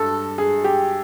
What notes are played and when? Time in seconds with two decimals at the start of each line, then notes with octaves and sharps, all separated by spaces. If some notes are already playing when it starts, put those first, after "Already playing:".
Already playing: G2 A4
0.38 G#4
0.64 G4